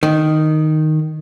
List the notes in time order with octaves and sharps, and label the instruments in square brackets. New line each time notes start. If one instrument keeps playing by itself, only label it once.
[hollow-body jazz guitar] D#3